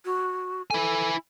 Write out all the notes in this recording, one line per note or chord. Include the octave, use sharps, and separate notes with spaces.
F#4
E4 A4 G#5